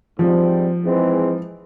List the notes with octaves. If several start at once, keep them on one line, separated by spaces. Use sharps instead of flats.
G#2 F3 G3 C4
G#2 E3 G#3 C4